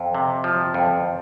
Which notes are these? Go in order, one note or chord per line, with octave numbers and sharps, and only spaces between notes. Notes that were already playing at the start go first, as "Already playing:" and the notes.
Already playing: F2
C3
F3
F2